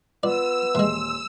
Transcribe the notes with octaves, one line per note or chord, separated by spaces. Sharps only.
B3 F4 D5 E6
D#1 E3 G#3 C6